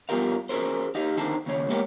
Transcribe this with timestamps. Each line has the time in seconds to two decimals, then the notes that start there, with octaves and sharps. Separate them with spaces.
0.09 G2 B3 F4 G4 A#4 F5
0.49 C#4 F#4 G#4 A#4 C5
0.95 D#4 G4 D#5 F5
1.17 D#2 D3 D#3 C4 D#4 A5
1.46 D#2 C#3 C#5
1.69 G#3 A#3 B3 G4 A#4 C#5